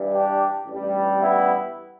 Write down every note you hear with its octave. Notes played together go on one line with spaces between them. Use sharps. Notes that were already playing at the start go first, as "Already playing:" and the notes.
Already playing: G2 E3 G3
D4 G4
A1 G2 G3
B3 E4